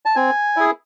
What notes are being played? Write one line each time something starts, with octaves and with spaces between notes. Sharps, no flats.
A5
C4 G#5
E4 G#4